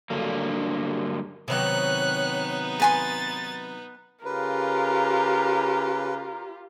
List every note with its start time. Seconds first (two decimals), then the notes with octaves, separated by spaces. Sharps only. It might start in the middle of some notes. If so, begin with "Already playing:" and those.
0.10 G2 D3 F#3 A#3
1.48 C3 D#3 F#3 B3 D#4 C#5 F#6
2.80 B4 G#5 C6 A6
4.25 C#3 F4 G4 A#4 B4